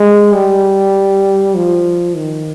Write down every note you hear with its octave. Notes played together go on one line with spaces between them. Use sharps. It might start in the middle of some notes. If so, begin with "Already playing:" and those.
Already playing: G#3
G3
F3
D#3